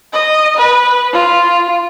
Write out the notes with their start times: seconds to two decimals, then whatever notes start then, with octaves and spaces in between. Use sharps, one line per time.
0.13 D#5
0.57 B4
1.13 F4